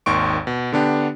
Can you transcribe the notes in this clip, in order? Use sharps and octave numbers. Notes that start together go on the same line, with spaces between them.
G#1 D#2 D#3 C6 C#6 D7
B2
D3 B3 D4 G4